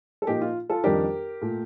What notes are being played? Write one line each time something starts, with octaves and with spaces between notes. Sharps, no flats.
A4
A#2 F3 A#3 D#4 G4
F4
F4 A4
F2 D#3 G3 D4 G4 A#4
A#2 A3